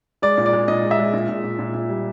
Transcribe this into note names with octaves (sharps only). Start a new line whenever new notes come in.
G#3 D5
A#2
D5
G#3
A#2 D#5
G#3
E5
G#3
A#2
A#2
A#2
A#2
A#2
G3